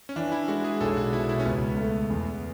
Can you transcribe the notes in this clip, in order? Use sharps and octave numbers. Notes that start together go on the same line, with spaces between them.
C#4
E3 D4
E4
G#3 F#4
G#4
B1 A4
F#4
B2 E4
E4
C#4
C#2 B3
A3
E2